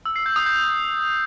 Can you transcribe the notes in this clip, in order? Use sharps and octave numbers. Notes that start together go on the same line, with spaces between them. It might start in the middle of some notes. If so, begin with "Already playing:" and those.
E6
C7
G6
D#6
G6